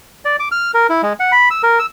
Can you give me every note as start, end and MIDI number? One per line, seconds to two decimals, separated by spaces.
0.25 0.36 74
0.39 0.49 86
0.52 0.71 89
0.74 0.87 70
0.89 1.02 64
1.03 1.13 56
1.20 1.32 78
1.32 1.49 83
1.51 1.62 88
1.63 1.79 70
1.79 1.86 88